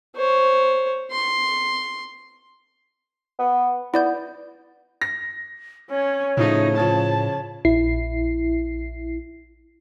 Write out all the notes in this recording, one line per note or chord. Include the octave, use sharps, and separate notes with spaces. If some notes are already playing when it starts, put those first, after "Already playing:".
C5 C#5
C6
B3
B3 E4 D5 G6
A#6
C#4 C#5
A2 C#3 F3 A3 D#4
C#3 F3 A5
A#1 E4 C7